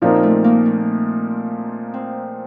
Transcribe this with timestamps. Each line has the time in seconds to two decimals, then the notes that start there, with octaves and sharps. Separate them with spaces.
0.02 A#2 F3 A#3 C4 D#4 A#4
0.23 A3
0.44 A#3
0.66 A3
1.94 C4